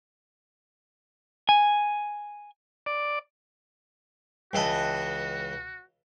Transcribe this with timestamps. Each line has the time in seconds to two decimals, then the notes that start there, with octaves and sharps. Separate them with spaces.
1.49 G#5
2.86 D5
4.53 C#2 E3 F#4 D#5 G5 A5